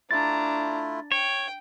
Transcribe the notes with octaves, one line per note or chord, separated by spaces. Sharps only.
A3 D4 E4 F4 A#5 A6
C#5 G5